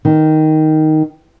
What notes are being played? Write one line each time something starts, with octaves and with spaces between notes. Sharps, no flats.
D#3